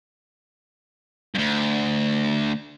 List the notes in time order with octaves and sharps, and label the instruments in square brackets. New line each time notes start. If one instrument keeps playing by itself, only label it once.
[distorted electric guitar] D2 G2